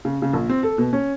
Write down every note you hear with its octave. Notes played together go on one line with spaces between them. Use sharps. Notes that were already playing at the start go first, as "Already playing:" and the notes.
C#3
C#3
A#1
C4
A4
B2
C#4